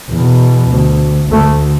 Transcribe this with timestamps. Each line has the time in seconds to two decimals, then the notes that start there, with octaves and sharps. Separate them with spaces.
0.10 E2 B2
0.70 D2
1.31 D2 A3